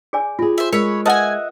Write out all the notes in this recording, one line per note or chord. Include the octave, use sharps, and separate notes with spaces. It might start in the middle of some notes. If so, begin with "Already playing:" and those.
G#4 D5 G#5
F4 G4 G#4
C5 E5
G#3 A#4 C#5 B5
B4 D#5 E5 F#5 G#5 A5